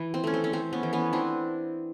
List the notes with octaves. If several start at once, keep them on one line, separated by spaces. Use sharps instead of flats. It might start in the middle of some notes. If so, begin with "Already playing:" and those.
Already playing: E3
C4
A3 C#4
C4
C#4
A3 C4
B3 C#4
E3
B3 C#4
E3 C4 D4